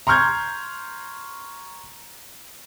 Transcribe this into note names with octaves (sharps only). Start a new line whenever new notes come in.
A#5 C6 C#6 F6 G6 G#6